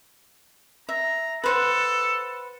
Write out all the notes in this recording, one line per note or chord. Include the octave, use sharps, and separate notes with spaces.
E5 A#5
A4 B4 C5 F#5